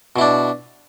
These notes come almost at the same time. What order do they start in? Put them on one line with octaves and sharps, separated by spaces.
B2 E4 D4